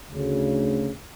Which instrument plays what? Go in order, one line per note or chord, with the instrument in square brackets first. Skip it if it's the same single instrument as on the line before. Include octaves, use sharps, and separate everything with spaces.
[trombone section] D2 C#3